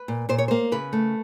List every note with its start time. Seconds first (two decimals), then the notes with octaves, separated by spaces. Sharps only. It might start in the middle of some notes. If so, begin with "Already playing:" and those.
Already playing: B4
0.08 A#2
0.29 A#2 C5
0.38 C#5
0.48 A#3 C5
0.72 C#3 B4
0.93 A3